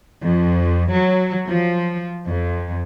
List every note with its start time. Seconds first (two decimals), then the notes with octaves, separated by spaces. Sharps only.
0.22 F2
0.93 F#3
1.48 F3
2.26 F2